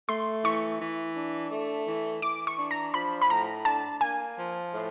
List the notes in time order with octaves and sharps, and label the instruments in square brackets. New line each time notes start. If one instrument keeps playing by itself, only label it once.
[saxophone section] A3 [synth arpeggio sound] C6
[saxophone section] E3 [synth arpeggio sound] C#6
[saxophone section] E3
D4
A3
E3
[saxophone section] E3 [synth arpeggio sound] D6
[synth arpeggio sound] C#6
[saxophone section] D4
[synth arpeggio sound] A#5
[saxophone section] F3 [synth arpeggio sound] B5
[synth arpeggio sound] B5
[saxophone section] A2 [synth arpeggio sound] A#5
[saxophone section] D4 [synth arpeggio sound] A5
[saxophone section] A#3 [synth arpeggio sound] G#5
[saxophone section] F3
A2